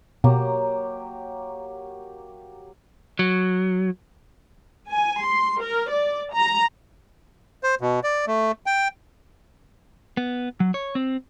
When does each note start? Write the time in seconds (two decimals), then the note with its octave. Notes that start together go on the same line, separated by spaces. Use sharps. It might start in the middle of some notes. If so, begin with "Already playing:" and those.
0.24 B2 F#3 A#3 G4
3.19 F#3
4.91 G#5
5.24 C6
5.62 A#4
5.91 D5
6.34 A#5
7.63 C5
7.81 B2
8.04 D5
8.27 A3
8.66 G5
10.17 B3
10.60 F#3
10.74 C#5
10.95 C4